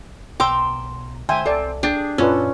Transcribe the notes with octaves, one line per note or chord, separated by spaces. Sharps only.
B1 B2 G5 A#5 C6 D6 E6
D3 G#3 C5 E5 G5 G#5
C2 C4 A4 D5
D4 G4 G#4
F#2 A#2 C#4 D4 F4 A4 B4